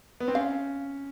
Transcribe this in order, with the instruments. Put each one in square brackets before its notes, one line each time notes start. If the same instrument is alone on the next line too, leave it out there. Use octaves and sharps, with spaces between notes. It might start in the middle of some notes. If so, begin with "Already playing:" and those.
[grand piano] B3
C4
[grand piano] C#4 [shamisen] F5